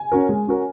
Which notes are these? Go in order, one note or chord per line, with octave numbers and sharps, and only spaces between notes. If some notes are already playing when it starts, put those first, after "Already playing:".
Already playing: G#5
C#4 F#4 A#4
G#3
C#4 F#4 A#4